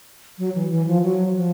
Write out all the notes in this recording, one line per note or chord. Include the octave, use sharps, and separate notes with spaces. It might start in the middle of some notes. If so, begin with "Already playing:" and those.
F#3
E3
E3
F3
F#3
F3